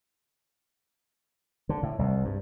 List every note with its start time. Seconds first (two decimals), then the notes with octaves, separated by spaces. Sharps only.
1.69 D3
1.83 A2
1.99 C2
2.25 G2